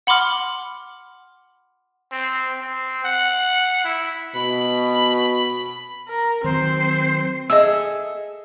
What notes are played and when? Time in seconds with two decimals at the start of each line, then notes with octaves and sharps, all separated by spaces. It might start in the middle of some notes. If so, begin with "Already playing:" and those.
0.07 F#5 B5 C6 D6 F6
2.12 C4
2.61 C4
3.04 F#5
3.85 E4
4.35 B2 B5
6.08 A#4
6.44 D#3 F#3 C4 C5
7.50 G#4 A4 D#5 E5 E6